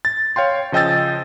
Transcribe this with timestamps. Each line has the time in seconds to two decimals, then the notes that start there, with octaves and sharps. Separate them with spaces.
0.05 A6
0.36 C#5 F5 G5 C6
0.72 C#3 F3 D#5 G5 E6 A6